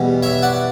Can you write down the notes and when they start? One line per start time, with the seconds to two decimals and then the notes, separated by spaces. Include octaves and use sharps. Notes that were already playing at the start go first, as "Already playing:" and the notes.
Already playing: E2 B2 G3
0.23 C#5 E5
0.42 D5 F#5